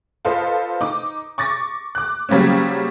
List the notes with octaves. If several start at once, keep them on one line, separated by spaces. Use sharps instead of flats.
F4 A4 B4 C5 D#5 F5
D#4 D6
C#6 D6 A6 A#6
D6 F#6
C#3 F#3 G3 A#3 C4 C#4